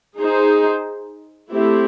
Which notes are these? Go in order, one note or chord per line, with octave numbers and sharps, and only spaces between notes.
D#4 G#4 C5
A3 C4 E4 G4